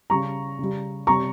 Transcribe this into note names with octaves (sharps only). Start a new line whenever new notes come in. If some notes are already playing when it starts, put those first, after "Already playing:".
C#3 G3 A#5 C#6
C#3 G3
C3 G3 A#5 C#6